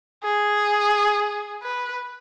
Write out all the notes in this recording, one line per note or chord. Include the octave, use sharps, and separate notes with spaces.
G#4
B4